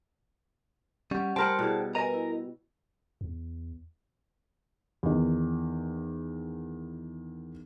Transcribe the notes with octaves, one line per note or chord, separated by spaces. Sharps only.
G3 C#4 F#5
G3 A#4 C5 F#5 G5 A5 C6
B2 E4 G#4 D5
A#4 B4 D#5 G#5 A#5
E4
E2
E2 D#3